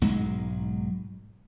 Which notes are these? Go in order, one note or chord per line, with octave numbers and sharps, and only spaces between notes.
B1 G#2 F#3 G#3